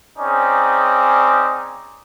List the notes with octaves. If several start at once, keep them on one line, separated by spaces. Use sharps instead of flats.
C4 C#4 D#4 G#4 D5